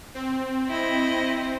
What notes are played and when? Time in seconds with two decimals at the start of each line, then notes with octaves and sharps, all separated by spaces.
0.15 C4
0.68 E4 D#5